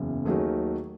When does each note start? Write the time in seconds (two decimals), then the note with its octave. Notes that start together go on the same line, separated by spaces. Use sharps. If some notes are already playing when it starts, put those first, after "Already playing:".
Already playing: F#1 E2
0.25 D#2 D#3 F#3 A3 G#4